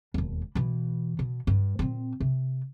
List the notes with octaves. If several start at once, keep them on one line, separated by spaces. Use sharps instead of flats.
E1 D#2
B2 E3
B2
G2
A#2 C4
C3